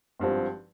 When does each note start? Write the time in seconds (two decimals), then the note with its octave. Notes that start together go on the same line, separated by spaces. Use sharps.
0.20 G#1 G2 F3 C4